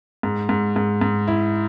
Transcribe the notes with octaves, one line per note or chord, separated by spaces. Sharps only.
G#2
G#2
G#2
G#2
E4